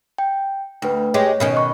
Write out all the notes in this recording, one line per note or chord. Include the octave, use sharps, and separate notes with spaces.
G5
D2 B4 G5
G#3 G4 C#5
B2 D#3 C#4
B5 C#6 F#6